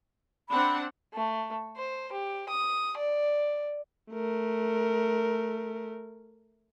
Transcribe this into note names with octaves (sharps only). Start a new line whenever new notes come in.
C4 D4 F#5 B5
A3
C5
G4
D#6
D5
A3 A#4